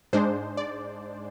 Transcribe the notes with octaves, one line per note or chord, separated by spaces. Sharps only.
G#2 G#3 D4 C5
D5